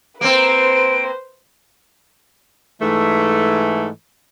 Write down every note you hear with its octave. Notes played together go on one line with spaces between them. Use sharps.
A#3 C4 B4 C5 D7
G#2 E3 A3